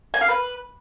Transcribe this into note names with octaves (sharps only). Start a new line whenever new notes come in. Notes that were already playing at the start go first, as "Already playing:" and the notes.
G#5
F5
B4